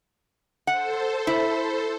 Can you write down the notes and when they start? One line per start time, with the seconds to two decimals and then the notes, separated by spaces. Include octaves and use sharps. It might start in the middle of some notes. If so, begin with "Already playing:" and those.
0.67 A4 C5 F#5
1.27 E4